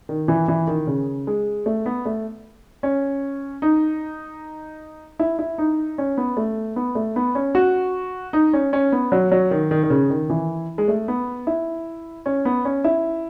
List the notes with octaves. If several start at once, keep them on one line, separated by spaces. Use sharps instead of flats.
D#3
E3
E3
D#3
C#3
G#3
A3
B3
A3
C#4
D#4
E4
E4
D#4
C#4
B3
A3
B3
A3
B3
C#4
F#4
D#4
C#4
C#4
B3
F#3
F#3
D#3
D#3
D#3
C#3
D#3
E3
G#3
A3
B3
E4
C#4
B3
C#4
E4